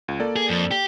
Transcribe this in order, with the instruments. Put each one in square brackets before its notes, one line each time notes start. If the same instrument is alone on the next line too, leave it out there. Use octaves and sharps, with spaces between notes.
[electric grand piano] C#2
A#3 A4 D5
[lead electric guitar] G#4
F2
G4